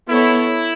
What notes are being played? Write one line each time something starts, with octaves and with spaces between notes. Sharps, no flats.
B3 E4 A4 C#5